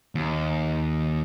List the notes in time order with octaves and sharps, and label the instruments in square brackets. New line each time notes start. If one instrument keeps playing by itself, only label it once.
[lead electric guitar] D#2